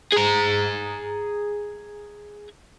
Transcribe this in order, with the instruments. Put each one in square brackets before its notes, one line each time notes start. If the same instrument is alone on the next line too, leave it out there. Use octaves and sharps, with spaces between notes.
[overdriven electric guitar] G#4 A#5